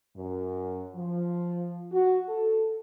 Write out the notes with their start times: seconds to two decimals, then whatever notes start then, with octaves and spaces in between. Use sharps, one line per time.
0.17 F#2
0.95 F3
1.92 F#4
2.29 A4